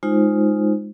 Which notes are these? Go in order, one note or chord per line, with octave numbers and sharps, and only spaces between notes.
G#3 D#4 F4 C5